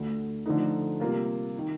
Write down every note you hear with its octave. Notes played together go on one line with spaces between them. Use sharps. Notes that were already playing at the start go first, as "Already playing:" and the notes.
Already playing: D2 D3 A3
D3 F3 A3 D#4
C3 G3 A#3 F4
D#3